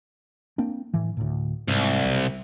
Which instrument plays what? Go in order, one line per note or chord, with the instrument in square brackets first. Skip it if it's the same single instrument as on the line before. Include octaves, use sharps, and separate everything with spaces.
[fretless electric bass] A#3 C4 D4
A2 E3
D2 A2
[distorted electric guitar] C2 [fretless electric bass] G#2
[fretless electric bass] B1